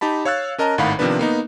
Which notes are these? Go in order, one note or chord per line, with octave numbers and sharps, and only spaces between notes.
D#4 G4 A5 B5
C#5 F5 E6 F#6 A6
C#4 A#4 D#5 A5 A#5
G#1 A2 D#3 F5 F#5 B5
C3 D#3 F3 B3 D4 B4
A#3 B3 D#4